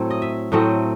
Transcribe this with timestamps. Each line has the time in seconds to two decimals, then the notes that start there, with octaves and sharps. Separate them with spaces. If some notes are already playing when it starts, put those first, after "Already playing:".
Already playing: A2 F#3 A3 C4
0.10 D#5
0.22 E5
0.52 A2 F#3 A3 C4 D#5